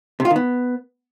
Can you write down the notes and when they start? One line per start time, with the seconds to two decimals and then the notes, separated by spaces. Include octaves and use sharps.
0.20 C3
0.25 F4
0.30 D#3
0.36 B3